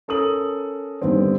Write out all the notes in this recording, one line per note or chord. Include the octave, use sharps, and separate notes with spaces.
C#4 A4 A#4 D#6 F#7
G2 D3 D#3 B3 C4